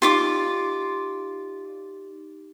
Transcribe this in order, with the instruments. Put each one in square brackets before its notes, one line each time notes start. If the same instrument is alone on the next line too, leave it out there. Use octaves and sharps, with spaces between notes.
[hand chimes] D#4 G4 [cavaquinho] F4 D5 D6